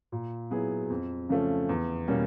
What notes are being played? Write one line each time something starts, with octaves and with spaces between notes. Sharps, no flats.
A#2
F#3 B3 E4 G#4
F2
C#3 F3 A3 C#4
E2
B2 G3 A#3 C#4